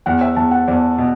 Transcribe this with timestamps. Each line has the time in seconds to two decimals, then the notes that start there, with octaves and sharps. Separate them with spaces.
0.06 E2 F#5
0.21 E5
0.36 E2 A5
0.51 F#5
0.68 E2 D5
0.98 B2